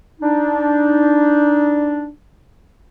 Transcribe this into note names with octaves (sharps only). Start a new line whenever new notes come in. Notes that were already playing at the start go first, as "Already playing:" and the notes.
D4 D#4